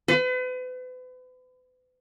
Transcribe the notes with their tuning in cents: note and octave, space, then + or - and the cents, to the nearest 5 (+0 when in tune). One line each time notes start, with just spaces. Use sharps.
B4 +40